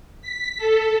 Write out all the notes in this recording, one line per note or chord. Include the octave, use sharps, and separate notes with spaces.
B6
A4